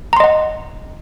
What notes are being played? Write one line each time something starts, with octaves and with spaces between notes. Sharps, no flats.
D#5 F#5 A#5 C6